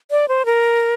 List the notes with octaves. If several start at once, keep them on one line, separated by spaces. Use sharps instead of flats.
D5
C5
A#4